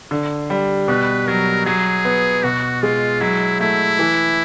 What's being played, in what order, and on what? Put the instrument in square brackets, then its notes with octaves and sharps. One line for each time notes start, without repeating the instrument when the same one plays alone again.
[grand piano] D3
G3
[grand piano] B2 [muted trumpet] B4
[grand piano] F#3 [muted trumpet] A#4
[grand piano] F#3 [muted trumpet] G#4
[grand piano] B3
[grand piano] B2 [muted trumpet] F#4
[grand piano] G#3 [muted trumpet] F4
[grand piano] F#3 [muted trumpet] E4
[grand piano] A3 [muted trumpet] E4
[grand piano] E3